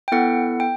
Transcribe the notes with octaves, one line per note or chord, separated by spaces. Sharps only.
G5
B3 E4 A4 F#5
G5